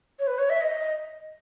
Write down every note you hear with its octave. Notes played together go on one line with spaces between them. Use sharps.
C#5
B4
C#5
E5
D#5